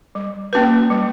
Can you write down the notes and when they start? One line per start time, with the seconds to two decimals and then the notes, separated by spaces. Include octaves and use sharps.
0.15 G3
0.53 A#3 C#4 F#4 B4
0.90 G3